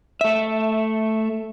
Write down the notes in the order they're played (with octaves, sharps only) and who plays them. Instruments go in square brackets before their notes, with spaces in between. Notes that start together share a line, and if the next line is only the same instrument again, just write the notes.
[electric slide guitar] A3 E5